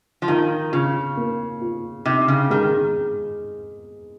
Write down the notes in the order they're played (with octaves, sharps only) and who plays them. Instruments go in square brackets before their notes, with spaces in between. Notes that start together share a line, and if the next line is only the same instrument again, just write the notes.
[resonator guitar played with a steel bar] F3
[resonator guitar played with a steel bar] D#3 [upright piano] F4
[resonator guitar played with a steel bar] C#3 [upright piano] F4
[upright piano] A#3
F4
[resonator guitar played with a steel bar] C3 [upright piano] D#4
[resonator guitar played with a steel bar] C#3
[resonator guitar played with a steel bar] D#3 [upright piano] G#3